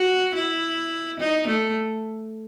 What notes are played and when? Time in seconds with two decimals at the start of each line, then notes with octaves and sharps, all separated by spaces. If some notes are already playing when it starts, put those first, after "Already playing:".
Already playing: F#4
0.35 E4
1.19 D#4
1.47 A3